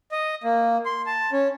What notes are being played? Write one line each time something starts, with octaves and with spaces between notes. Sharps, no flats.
D#5
A#3
C6
A5
C#4